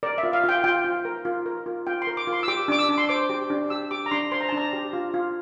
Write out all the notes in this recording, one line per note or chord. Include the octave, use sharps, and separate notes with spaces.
A#4 D5
E5
F4
F5
F4 G5
F4 G5
F4
A#4
F4
A#4
F4
F4 G5
C6
A#4
D6
F4
C6
E6
G4 D6
D4 D6
E6
D4
C6
C5 D6
G4
D4
G4 E6
G4 D6
A#5
D4 C6
C5 C6
A#5
D4 A5
A#5
G4
F4
F4